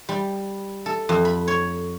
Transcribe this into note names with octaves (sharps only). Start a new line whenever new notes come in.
G3
A4
F2
B5
C#5